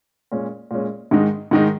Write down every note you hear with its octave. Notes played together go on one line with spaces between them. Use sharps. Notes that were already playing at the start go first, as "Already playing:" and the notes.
A#2 G#3 C#4
A#2 G#3 C#4
G#2 D#3 G#3 D#4
G#2 D#3 G#3 D#4